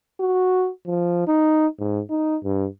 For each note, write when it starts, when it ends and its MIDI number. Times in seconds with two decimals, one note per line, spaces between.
0.20 0.70 66
0.87 1.24 53
1.27 1.67 63
1.79 2.01 44
2.10 2.36 63
2.44 2.67 43